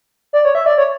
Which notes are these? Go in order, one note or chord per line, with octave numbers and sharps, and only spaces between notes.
D5
C#5
E5
D5
C#5